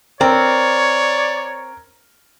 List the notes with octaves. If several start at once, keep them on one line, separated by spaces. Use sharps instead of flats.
C4 A#4 C#5 D5